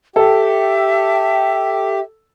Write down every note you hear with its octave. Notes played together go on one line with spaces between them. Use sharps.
G4 A4 E5 G5